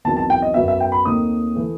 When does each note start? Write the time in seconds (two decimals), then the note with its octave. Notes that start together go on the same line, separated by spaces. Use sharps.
0.04 E2 D#3 F#3 C4 A5
0.17 A5
0.30 G5
0.42 D#5
0.54 F#2 F#3 B3 E5
0.68 E5
0.80 G5
0.92 B5
1.05 D#2 D#3 A3 C4 D#6
1.56 E3 A3